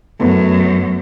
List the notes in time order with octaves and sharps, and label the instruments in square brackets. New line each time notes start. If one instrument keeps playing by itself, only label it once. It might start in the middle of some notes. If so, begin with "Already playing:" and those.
[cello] F#2 [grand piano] A3 B3